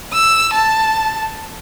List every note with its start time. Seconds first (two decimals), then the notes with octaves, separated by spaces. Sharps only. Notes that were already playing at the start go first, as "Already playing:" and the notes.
0.13 E6
0.53 A5